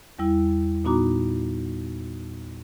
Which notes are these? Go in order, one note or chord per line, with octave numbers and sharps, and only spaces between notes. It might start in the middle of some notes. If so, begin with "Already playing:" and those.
E2 G3 E4
A#2 B3 D#4 F#4 A#5 D6